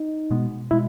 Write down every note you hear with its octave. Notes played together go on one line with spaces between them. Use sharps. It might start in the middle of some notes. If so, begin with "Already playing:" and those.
Already playing: D#4
B2 G#3 B3
B2 G#3 E4